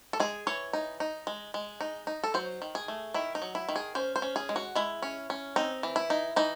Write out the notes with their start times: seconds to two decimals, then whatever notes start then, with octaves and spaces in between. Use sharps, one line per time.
0.13 A4
0.20 G#3 G#4
0.47 E3 C#5
0.73 D#4
1.00 D#4
1.27 G#3
1.54 G#3
1.81 D#4
2.07 D#4
2.24 A4
2.34 F#3 C5
2.62 D#3
2.75 G#4
2.88 A3
3.14 D#3 E4
3.35 D#4
3.42 F#3
3.55 E4
3.69 D#3
3.76 G#4
3.95 C#4 C5
4.16 C5
4.22 C#4
4.36 G#4
4.49 G#3
4.56 F#4
4.75 G#3 E4
5.02 C#4
5.30 C#4
5.56 C4 D#4
5.83 E3
5.96 E4
6.10 D#4
6.36 E3 D#4